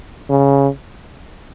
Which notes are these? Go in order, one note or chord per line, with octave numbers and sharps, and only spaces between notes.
C#3